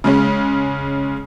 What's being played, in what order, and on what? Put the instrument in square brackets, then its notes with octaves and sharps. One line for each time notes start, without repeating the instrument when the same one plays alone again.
[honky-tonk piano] C#3 G#3 C#4